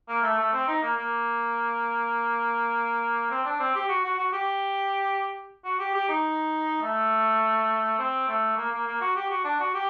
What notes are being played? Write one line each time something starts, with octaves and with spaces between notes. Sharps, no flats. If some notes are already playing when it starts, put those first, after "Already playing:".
A#3
A3
A3
C4
D#4
A#3
A#3
C4
D4
C4
G4
F#4
F#4
F#4
G4
F#4
G4
G4
D#4
A3
C4
A3
A#3
A#3
A#3
F#4
G4
F#4
D4
F#4
G4